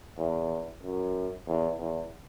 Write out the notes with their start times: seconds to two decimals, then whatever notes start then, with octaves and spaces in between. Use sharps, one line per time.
0.18 E2
0.83 F#2
1.47 E2
1.79 E2